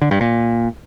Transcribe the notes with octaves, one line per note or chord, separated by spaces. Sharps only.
D3
G2
A#2